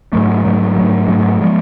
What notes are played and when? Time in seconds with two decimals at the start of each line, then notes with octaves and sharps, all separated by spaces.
0.13 G#2 F#3 A3
0.44 G#2 F#3 A3
0.76 G#2 F#3 A3
1.08 G#2 F#3 A3
1.41 F3 G#3